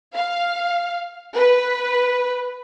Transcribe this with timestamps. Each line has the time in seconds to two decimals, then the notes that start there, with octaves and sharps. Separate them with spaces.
0.15 F5
1.36 B4